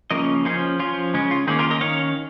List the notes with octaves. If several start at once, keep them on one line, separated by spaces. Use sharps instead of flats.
C#3 F3 A#3 C#4 A#4 D#5
F3 C#4 D#4 G#4
F3 C#4 F4
C#3 G#3 C#4
F4
D#3 A#3 C#4 D#4 G#4
F4 A#4
A#4 D#5
D#3 C#4 C#5 F5